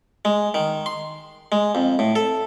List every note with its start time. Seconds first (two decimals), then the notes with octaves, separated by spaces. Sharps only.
0.25 G#3
0.54 D#3
0.86 C6
1.52 G#3
1.75 F2
1.99 A2
2.16 A4